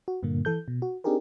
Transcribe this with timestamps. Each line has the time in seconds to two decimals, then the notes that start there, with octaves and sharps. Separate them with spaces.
0.08 F#4
0.23 G2 A#2 D3 A#3
0.45 E3 A4 G6
0.68 B2
0.82 F#4
1.04 C4 D4 D#4 G4 G#4 A#4